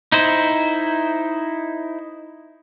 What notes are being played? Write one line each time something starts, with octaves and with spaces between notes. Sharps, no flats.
D#4 E4 C5